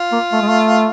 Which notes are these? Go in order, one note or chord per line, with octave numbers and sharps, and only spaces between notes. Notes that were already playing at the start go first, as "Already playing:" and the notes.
Already playing: F4
A#3
A3
G#3
A3